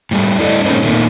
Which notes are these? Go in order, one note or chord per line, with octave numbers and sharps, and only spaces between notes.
A2 G3 A3
D4 E4 A4 D5 D#5
A2 G#3 A#3 C4 C#4 D#4
A#2 D#3 A3